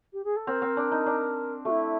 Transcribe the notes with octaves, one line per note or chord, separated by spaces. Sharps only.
G4
G#4
A4
C4 A#4
C4
D4
D#4
D4
A3 F#4
E4